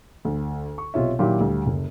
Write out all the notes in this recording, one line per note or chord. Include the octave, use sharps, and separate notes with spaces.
D2
C#6
B1 C3 F4 C#5 E5
A#2 D#3 F#3 E4 G4
D2 G3
F#1